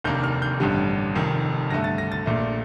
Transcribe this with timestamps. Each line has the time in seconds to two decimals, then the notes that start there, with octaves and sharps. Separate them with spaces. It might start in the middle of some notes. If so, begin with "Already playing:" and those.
0.04 F1 D#2 D#3 A#3 D4 G6
0.24 F6
0.42 G6
0.60 A1 G2 D3 G3
1.15 F1 F2 D#3
1.70 G2 D3 A3 A#6
1.84 A6
1.98 A#6
2.12 A6
2.26 A#1 A#2 A3